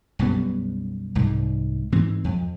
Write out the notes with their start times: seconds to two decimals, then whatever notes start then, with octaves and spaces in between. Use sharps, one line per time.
0.19 B1 F#2 G3 B3
1.15 C2 G#2
1.92 G#2 E3 C4
2.24 F2